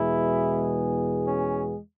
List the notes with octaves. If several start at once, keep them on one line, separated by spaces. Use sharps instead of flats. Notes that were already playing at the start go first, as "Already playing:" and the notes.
Already playing: E2 B2 G#3 B3 E4 G#4
C#4